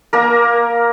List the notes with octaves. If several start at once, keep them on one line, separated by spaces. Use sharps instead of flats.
A#3 A#4 A#5